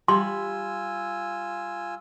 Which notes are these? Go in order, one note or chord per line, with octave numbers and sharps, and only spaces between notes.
G3 F4 G#5 C6 E6